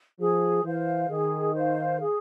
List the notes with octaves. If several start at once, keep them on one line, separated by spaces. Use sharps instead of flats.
F3 G#4
E3 C5 F5
D#3 G#4
C5 F5
G#4